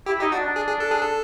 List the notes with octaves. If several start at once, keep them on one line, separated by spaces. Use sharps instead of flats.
E4 G4
D#4 G4
D4 F#4
D4
G#4
G#4
A4
G#4
A4